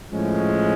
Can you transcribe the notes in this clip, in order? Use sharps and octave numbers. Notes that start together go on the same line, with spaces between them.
A2 F3 G#3 C#4